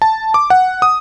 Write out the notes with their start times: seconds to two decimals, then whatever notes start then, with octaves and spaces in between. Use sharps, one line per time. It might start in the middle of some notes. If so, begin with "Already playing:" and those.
0.02 A5
0.34 D6
0.50 F#5
0.82 D#6